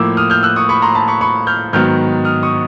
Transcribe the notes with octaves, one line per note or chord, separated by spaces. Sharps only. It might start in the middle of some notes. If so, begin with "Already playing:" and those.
Already playing: A2 F3 A#3 D6 E6
D#6 F6
F6 G6
E6 F#6
C#6 D#6
B5 C#6
A#5 C6
A5 B5
B5 C#6
B5 C#6
F6 G6
G#2 D#3 F#3 B3 F6 G6
D#6 F6
C#6 D#6